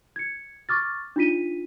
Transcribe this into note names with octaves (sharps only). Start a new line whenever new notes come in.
G#6 C#7
C#6 D6 F6 A6
D4 D#4 F4 B6 D#7